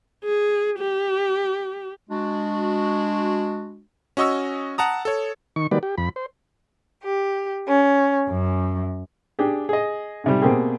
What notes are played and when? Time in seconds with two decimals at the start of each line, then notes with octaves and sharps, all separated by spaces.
0.25 G#4
0.79 G4
2.10 G#3 D4 F#4
4.17 C#4 F#4 D#5 C#6 E6
4.78 F#5 A5 A#5 D#6
5.05 A4 C#5
5.56 D#3 C#6
5.71 D#3 F#3 G3 A#3 B4 D5
5.83 G4
5.98 F2 B5
6.16 C5
7.03 G4
7.67 C#4
8.29 F#2
9.39 D4 G4 G#4
9.69 G#4 D#5
10.24 G#2 C3 G3
10.42 B2 A#3 C4 G4 G#4